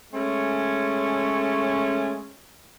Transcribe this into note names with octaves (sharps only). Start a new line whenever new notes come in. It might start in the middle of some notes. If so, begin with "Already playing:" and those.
G#3 A3 C#4